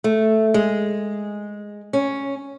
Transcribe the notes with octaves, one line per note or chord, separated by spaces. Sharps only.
A3
G#3
C#4